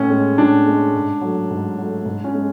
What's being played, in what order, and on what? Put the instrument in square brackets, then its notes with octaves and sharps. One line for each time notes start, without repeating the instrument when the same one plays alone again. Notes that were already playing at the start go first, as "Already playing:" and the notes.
Already playing: [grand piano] A2 C#4
G#3
A2 D4
G#3
G#2
F#3 A3
G#2
F#3 A3
G#2
C#4
G#3